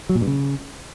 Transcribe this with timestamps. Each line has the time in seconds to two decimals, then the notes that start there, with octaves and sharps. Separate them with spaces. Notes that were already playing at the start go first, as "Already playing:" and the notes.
0.09 F#3
0.15 A#2
0.21 G2
0.27 C#3